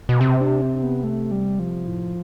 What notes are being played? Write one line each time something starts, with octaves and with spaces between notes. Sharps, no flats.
B2
C3 C4
D4
C4
B3
A3
G3
F3
A2